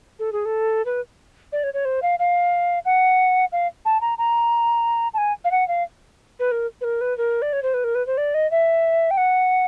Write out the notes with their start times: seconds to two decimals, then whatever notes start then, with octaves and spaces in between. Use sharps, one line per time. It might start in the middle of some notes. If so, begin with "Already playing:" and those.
0.19 A4
0.32 G#4
0.45 A4
0.86 B4
1.52 D5
1.64 C#5
1.74 C#5
1.85 C5
2.03 F5
2.19 F5
2.85 F#5
3.52 F5
3.85 A5
4.01 A#5
4.18 A#5
5.14 A5
5.18 G#5
5.45 F5
5.52 F#5
5.68 F5
6.40 B4
6.52 A#4
6.81 B4
6.84 A#4
7.01 B4
7.18 A#4
7.42 D5
7.53 C#5
7.63 C5
7.74 B4
7.84 A#4
7.95 B4
8.07 C5
8.18 D5
8.34 D#5
8.51 E5
9.11 G5
9.17 F#5